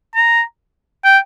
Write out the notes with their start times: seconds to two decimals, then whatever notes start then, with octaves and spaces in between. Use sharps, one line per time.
0.14 A#5
1.04 G5